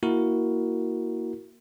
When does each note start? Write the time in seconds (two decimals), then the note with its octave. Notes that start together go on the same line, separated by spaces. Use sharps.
0.03 A#3 E4 F#4 A#4